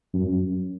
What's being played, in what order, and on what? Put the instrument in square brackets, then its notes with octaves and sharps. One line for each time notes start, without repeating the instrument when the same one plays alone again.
[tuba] F#2